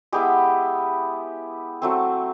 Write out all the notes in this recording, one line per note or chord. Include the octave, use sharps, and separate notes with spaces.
G#3 B3 E4 G4
F#3 A3 C4